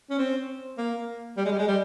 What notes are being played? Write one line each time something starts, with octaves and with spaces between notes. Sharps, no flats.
C#4
C4
A#3
G3
G#3
G3
G#3
G3